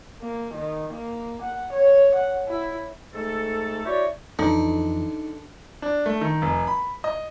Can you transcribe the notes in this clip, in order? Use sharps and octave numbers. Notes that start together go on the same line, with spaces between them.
A#3
D#3
A#3
F#5
C#5
F#5
E4
G#2 A3 A4
E4 F#4 G4 C#5 D5
F2 D3 E3 D#4
D4
A3
D#3
F1
B5
D#5